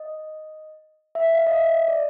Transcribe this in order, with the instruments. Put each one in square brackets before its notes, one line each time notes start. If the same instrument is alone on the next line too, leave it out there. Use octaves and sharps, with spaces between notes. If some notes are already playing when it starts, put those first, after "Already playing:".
Already playing: [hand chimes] D#5
E5
F5
D#5
E5
D#5
D5